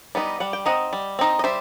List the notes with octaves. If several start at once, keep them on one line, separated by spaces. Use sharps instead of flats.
G3 B3 D#4
G3 F#5
G5
C4 D#4 D#5 F#5
G3
C4 D#4
D#5
G3 C5 E5